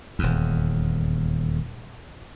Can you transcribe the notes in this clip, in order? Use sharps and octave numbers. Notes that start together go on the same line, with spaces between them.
D#1 E2